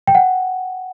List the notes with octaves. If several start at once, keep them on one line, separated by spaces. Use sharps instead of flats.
G5
F#5